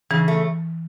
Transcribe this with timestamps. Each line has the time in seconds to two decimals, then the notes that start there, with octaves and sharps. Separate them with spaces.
0.10 C#3 E3
0.28 A3